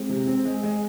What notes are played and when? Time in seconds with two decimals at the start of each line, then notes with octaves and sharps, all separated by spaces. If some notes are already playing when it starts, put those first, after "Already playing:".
Already playing: G#3 C4
0.09 C3
0.27 C4
0.45 G#3
0.63 G#3